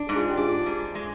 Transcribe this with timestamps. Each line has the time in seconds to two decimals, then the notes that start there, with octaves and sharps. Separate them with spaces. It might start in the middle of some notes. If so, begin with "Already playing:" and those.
Already playing: D4
0.09 G#2
0.16 F4 G#4
0.30 G4
0.37 D4 F4 G#4
0.66 G#2
0.95 G#3